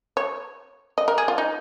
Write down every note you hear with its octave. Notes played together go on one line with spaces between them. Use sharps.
C#5
D#5
A#4
G#4
F4
D#4